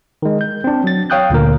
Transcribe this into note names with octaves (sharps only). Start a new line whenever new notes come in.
D#3 G#3
G6
C4 D4
F#3 A6
C#5 F5 G5 D#6 F#6 G6
D2 A#2 D3 A#4